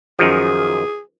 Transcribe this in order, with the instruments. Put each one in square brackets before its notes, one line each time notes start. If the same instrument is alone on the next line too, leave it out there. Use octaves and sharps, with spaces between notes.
[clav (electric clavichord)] F#2 D#3 F3 [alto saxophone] G#4